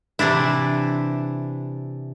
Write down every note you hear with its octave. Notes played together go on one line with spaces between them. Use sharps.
C3 E3 D4 E4